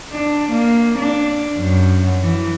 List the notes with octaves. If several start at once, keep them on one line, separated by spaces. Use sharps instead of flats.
D4
A#3
D4
F#2
E3